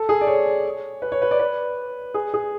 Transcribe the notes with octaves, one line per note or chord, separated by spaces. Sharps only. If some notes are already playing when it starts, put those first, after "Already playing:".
Already playing: A4
G#4
D5
C#5
B4
C#5
B4
D5
B4
G#4
G#4